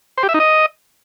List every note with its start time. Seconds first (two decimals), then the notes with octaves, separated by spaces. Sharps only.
0.18 C5
0.23 G4
0.29 E5
0.34 D#4
0.40 D#5